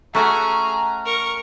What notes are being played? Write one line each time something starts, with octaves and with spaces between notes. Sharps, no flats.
A3 C#4 F#4 G#4 F#5 A#5
A#4 C#6